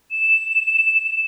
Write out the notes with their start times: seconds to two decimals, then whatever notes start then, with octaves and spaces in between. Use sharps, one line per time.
0.11 E7